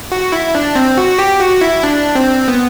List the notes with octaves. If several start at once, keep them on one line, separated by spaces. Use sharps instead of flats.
F#4
E4
D4
C4
F#4
G4
F#4
E4
D4
C4
B3